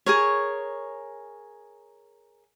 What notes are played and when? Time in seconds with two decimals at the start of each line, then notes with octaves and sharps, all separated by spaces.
0.06 G#4 A#4 C#5